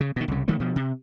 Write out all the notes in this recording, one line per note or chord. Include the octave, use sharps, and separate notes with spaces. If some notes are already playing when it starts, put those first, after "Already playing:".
C#3
B2 D#3
C2 C#3
D#3 G3 A3 A#3
B2 F3
C3